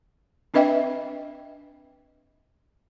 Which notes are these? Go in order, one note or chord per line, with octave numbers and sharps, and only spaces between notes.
C4 D4 B4 D#5 E5 G5